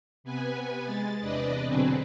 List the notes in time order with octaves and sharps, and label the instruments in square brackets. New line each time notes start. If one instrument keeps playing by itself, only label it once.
[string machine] C3 B3 B4 G#5
G#3 A6
E2 C3 D4 B4 D5 D#5
B2 D3 F#3 C4 G#4 B4